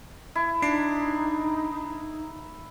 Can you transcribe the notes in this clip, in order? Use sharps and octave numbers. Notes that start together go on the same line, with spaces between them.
E4
D4 D#4 C7 D7